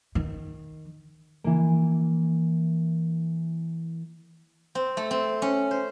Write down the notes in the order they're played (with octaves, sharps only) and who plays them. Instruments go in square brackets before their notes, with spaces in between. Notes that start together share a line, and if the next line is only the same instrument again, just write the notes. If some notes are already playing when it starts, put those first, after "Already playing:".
[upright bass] D#3
[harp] E3 A#3
[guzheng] C4
A3
C4
C#4
C5